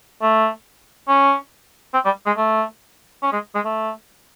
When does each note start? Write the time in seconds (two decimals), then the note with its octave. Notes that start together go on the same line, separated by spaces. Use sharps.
0.22 A3
1.08 C#4
1.94 C4
2.05 G3
2.26 G#3
2.37 A3
3.23 C#4
3.33 G#3
3.55 G#3
3.65 A3